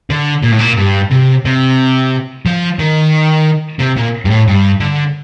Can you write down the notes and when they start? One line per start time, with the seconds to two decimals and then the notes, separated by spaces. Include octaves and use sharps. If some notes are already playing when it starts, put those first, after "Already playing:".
0.10 D3
0.44 A#2
0.52 A2
0.60 A#2
0.78 G2
1.11 C3
1.45 C3
2.46 F3
2.79 D#3
3.80 C3
3.97 A#2
4.25 G2
4.30 A2
4.48 G2
4.80 D3